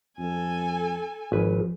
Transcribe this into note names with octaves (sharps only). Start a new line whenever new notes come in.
F2 A4 G#5
G#1 F3 B4